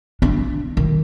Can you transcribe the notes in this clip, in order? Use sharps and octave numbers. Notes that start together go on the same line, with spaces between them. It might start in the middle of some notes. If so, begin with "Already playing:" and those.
D4
D#3